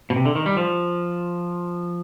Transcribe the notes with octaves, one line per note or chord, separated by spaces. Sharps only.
B2
C3
D3
D#3
G3
F3